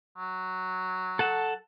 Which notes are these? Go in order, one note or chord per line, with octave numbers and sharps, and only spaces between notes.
F#3
A4 F#5 A5